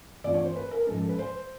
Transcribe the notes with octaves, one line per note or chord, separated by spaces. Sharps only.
G2 E3 A3 C4 F4 D5
C#5
C5
B4
A#4
G#2 F3 G#3 C#4 A4
A4
B4
C5